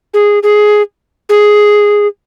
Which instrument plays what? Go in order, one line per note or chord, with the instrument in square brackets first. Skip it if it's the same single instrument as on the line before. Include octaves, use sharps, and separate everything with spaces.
[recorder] G#4
G#4
G#4